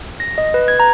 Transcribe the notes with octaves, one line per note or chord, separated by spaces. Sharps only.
A#6
D#5
B4
G#6
A#5